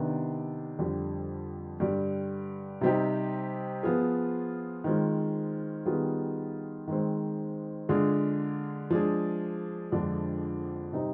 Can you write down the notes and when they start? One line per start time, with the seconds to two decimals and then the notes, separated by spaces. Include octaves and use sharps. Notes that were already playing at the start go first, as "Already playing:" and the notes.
Already playing: C3 D#3 B3 D4
0.79 F2 D3 G3
1.80 G2 D3 G3
2.81 C3 G3 C4 D#4 G4
3.83 F3 B3 F4 G#4
4.84 D#3 G#3 C4 F4
5.86 D#3 G3 B3 F4 G#4
6.88 D#3 G#3 C4
7.89 D3 G#3 D4 F4 G#4
8.90 F3 G#3 D4 G#4
9.91 F2 D3 F3 G#3 D4
10.93 C3 G3 C4 D#4